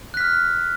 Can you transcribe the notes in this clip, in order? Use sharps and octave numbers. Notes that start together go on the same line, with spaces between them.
F6 F#6 B6